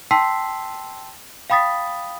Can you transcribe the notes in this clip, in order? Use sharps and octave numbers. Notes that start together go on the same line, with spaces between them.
G5 A5 C6 E6 B6 C7
F5 G5 B5 D#6 A6 B6